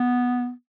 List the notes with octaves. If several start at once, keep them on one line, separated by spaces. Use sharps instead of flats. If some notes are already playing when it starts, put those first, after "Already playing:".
Already playing: B3